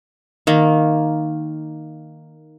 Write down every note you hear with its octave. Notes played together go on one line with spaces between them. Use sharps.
D#3 A#3